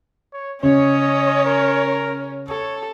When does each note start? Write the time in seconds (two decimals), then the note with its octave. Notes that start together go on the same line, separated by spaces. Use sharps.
0.33 C#5
0.63 C#3 C#4 C#5 D#5
1.46 A#4
2.49 A4 C#5